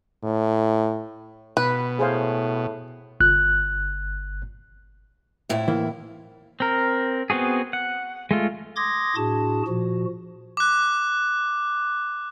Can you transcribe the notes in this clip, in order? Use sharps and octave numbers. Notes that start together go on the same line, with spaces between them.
A2
B2 B4
A2 G#4 C5 F5
G1 F#6
F2 A2 E4
E3 A#3
C4 A#4
B3 C4 F#4 G#4
F#5
G#3 A3 F4
C6 D6 D#6 G#6 A#6
A2 D4 F#4 G#4 A5
A#2 F3 F#4
D6 F#6